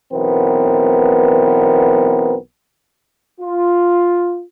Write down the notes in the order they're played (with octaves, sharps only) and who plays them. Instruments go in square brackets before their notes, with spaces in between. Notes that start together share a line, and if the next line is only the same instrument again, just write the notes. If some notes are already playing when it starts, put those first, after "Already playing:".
[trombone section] B1 E3 B3 C4 A#4
[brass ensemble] F4